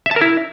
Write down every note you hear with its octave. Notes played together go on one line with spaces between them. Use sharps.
E5
A5
A#4
E4